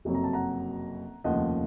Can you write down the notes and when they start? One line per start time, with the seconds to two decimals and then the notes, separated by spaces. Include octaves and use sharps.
0.05 F#1 F2 C3 F#3
0.15 A#5
0.24 A5
0.33 F#5 A#5
1.24 F1 D#2 C#3 F3 D#5 F#5